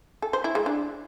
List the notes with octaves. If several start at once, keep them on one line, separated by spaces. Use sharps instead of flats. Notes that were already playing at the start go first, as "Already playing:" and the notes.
A4
C5
E4
G#3
D4